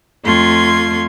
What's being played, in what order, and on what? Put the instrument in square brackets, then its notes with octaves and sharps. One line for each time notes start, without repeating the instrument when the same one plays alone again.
[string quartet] F2 A3 F4 C6 G#6